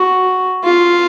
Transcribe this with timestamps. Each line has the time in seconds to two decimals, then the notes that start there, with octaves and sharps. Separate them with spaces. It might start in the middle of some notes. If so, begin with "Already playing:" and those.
Already playing: F#4
0.64 F4